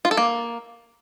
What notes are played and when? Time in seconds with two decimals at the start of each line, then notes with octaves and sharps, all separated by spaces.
0.05 F4
0.11 A4
0.17 A#3